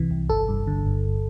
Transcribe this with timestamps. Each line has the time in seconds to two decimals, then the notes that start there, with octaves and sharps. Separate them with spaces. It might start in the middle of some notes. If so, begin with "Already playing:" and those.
Already playing: C2 C3 E3
0.11 C2
0.30 G1 A4
0.48 G2
0.67 D3
0.86 G1